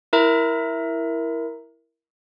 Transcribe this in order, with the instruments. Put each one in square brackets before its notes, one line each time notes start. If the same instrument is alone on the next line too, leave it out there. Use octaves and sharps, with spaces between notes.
[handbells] E4 A#4 E5 A#5